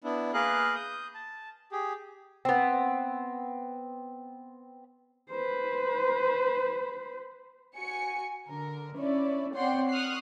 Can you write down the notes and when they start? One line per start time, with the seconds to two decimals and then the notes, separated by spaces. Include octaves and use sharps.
0.04 B3 D4 E4
0.34 A#3 G#4 A#4 B4 F5 F#6
0.75 D#6 G6
1.15 A5
1.72 G4 G#4
2.45 B3 C4
5.30 B4 C5
7.76 F#4 G#5 C#7
8.48 D3 A#4
8.96 C#4 D4 E4 C#5 D5
9.55 C4 C#5 D5 F#5 G5 C6
9.90 C#6 D#6 F6 F#6 C7